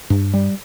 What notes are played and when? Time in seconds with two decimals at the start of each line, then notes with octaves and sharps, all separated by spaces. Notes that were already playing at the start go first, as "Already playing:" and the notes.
0.10 G2
0.34 G3